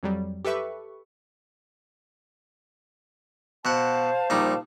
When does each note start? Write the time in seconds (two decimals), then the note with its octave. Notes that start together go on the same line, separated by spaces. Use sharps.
0.03 F2 F#3 G3
0.45 G4 A4 B4 E5 C#6
3.65 B2 C5 F5 F#5 A5
4.30 A#1 G3 D#4